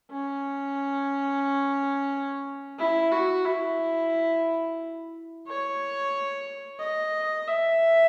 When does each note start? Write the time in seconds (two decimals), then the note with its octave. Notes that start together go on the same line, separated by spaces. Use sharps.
0.11 C#4
2.79 E4
3.12 F#4
3.45 E4
5.47 C#5
6.80 D#5
7.48 E5